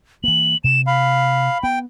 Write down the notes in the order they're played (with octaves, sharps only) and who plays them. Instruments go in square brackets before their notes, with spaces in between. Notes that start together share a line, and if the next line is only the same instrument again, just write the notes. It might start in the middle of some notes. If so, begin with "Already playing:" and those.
[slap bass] E3 A#3 [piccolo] F#7
[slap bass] C3 [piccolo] E7
[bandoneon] F5 [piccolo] B5
[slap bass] B3 [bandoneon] G5